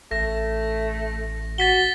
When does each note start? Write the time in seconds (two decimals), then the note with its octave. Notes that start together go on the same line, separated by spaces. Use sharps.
0.11 A1 A3 A#6
1.58 F#4 A6 B6 G7